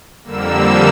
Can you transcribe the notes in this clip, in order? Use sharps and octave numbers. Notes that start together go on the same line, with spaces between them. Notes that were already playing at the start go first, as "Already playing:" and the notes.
F2 D3 G3 A#3 E6